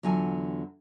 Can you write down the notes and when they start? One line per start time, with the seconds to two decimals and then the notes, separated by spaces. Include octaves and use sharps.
0.03 E2 D3 F#3 F4 G#5